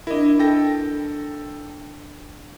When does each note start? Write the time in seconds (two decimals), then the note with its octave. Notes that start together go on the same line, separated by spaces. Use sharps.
0.07 D4 E4 A#4 D#5
0.39 A4 G5 A#6